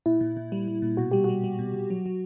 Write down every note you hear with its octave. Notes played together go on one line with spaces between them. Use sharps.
A#2 E4
A#2
A#2
G3
G3
A#2
B2 F#4
G3 G4
G3 F#4
G3
B2
B2
F#3
F#3